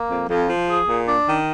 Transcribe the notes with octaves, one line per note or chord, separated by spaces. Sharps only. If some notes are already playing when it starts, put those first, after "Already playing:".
Already playing: A#3
F2
F2
F3
G#4
A#2
D4
D#3